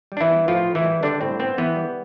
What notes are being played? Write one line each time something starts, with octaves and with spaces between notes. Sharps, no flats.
G3
D4
E3 E4
B3
A2 F3 F4
A2
E3 E4
G3
D3 G3 D4
A2 C4
B3 C4
E3 B3
G3